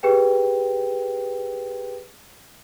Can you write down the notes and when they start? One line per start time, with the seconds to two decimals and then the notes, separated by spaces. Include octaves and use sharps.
0.03 G4 G#4 B4 G5